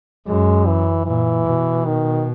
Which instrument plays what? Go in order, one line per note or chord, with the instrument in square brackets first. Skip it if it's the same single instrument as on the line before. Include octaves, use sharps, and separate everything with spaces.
[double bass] F#2 [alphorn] G#3
[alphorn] E3
[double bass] A#2 [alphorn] E3
[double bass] B2
[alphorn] D#3